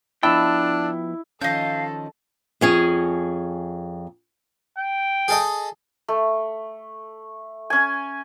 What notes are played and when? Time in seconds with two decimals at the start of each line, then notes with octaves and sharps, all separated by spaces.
0.23 F3 B3 D4 E4 G5 A5 E6
1.42 D#3 F3 C#4 A4 D#5 F5 G6
2.61 F2 C#4 G#4
4.78 G5
5.28 G#4 A4 D#5
6.08 A3
7.70 C#4 G#5